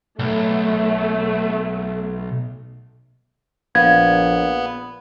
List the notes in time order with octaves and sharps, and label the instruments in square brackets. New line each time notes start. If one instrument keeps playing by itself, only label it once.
[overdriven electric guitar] B1 [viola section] A3
[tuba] A#1 [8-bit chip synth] B3 [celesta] F5 [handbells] G#6